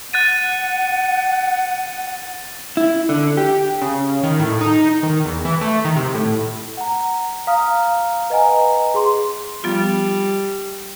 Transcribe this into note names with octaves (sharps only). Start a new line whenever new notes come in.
F#5 F#6 A6 D#7
E4
D3
G4
C#3
D#3
A2
D#4
D#3
E2
E3
A3
D#3
C3
A2
F#5 A#5
F5 A#5 D#6 F6
B4 D#5 F#5 G#5 A#5
G#4 C6
F3 G3 B3 F4